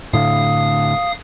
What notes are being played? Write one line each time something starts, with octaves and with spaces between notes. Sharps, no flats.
A2 D3 F5 D#6